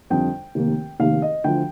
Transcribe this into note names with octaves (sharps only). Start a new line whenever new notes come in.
F2 D3 G3 G5
F1 D#2 D#3 A#3
F1 D#2 D#3 A#3 F5
D#5
D2 D3 F3 G5